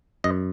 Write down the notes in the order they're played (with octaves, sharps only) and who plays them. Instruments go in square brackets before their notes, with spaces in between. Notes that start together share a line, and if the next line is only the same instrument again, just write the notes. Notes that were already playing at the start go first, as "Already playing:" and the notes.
[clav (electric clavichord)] F#2 D#5